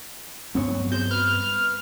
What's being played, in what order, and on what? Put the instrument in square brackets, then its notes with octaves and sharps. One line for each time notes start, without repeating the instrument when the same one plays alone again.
[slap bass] G2 B3 C4 [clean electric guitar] F#3 C#5
[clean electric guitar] F#4 G#4 C5 [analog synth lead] G6
[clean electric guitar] B4 [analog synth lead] F6